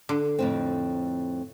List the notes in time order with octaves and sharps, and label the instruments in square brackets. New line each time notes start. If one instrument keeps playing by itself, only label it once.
[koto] D3
[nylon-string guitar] F2 A2 C4